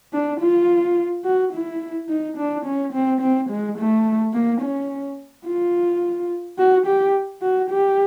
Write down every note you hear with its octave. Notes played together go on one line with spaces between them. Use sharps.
D4
F4
F#4
E4
D#4
D4
C#4
C4
C4
G#3
A3
A#3
C#4
F4
F#4
G4
F#4
G4